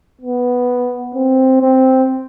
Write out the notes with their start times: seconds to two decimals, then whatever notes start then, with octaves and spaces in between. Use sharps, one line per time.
0.21 B3
1.15 C4
1.61 C4